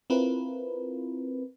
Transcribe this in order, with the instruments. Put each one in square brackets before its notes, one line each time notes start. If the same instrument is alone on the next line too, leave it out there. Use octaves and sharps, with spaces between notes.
[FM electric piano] C4 E4 F4 A#4 B4